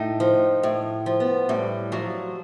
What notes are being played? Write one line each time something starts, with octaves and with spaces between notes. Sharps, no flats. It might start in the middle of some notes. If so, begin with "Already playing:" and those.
Already playing: A2 D#4
F3
A2
F3
B3
A2 G3
F3 F#3